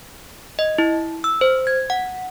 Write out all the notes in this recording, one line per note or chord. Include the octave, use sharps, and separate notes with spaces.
D#5
E4
E6
C5
G#6
F#5